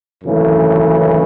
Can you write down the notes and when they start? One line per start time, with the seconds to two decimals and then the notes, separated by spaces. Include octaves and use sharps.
0.24 G#1 F#2 C#3 E3 A3